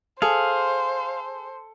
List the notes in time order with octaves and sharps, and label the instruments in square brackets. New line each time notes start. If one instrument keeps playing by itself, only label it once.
[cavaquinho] G#4 [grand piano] A4 [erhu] C5 [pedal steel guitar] F5